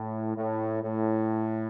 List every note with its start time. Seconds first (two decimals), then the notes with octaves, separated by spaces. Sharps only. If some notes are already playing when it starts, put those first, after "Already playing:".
Already playing: A2
0.37 A2
0.83 A2